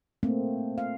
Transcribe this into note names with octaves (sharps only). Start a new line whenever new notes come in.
A3 A#3 C4
F5